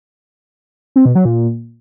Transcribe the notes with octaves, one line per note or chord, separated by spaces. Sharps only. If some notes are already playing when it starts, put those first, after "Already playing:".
C4
B2
F#3
A#2